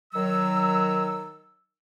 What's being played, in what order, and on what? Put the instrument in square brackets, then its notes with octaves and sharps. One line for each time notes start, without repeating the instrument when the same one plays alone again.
[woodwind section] D#3 F#3 E6